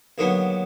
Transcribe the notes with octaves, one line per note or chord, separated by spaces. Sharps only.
D#2 D3 F#3 B3 D4